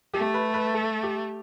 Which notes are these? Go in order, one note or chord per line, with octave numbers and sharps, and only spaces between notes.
A3 G4
B4
B4
A4
G4